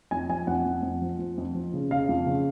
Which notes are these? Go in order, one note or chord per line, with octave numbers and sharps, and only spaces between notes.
F2 G#5
F3 G#5
F2 F#5
F2
F2
F3
F3
F2
F3
C#3
C#3 F5
F2
C#3